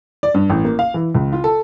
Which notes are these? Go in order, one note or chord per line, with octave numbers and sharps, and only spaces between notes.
D5
G2
A1
A#3
F5
E3
C#2
F4
A4